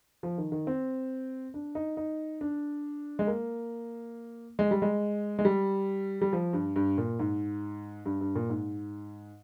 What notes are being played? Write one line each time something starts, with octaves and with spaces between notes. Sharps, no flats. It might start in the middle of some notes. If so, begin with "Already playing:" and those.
F3
D#3
D#3
C4
D4
D#4
D#4
D4
G#3
A#3
G#3
G3
G#3
G#3
G3
G3
F3
G2
G2
A#2
G#2
G2
G2
A#2
G#2